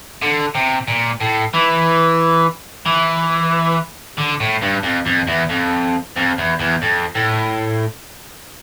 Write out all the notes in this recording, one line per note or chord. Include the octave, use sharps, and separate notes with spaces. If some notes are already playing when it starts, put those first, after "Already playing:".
D3
C3
A#2
A2
E3
E3
D3
A2
G2
F2
F2
E2
F2
F2
E2
E2
F2
A2